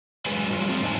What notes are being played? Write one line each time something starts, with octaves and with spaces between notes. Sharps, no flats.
G2 F#3 G#3 G#4 B4 G#5
F#3 G3 F4
A3 C4 F4
G#2 A3 D#4 C5 G#5 A5